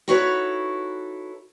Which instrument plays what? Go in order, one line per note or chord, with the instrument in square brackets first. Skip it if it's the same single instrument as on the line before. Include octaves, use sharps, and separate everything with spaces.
[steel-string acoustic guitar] D#4 E4 F#4 A4 B4 C#5